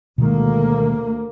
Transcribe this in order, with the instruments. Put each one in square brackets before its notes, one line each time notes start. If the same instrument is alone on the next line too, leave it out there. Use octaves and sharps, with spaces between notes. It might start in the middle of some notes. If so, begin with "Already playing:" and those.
[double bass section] D2 A#3 [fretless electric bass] B2 D#3 G#3